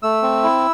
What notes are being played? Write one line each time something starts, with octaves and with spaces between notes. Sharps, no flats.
A3 E6
C4
E4